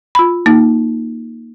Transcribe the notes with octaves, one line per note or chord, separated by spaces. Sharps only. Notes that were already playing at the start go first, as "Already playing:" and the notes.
F4 B5
A#3 D#4